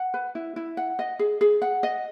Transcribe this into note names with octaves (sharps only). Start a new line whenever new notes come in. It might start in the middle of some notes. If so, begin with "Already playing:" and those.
Already playing: F#5
B4
E4
E4
F#5
D#5
G#4
G#4
F#5
D#5